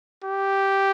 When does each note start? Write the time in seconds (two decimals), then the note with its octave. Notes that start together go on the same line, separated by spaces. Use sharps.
0.24 G4